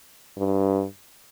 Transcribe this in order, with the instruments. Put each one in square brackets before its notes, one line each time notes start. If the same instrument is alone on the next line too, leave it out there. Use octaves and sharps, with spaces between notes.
[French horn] G2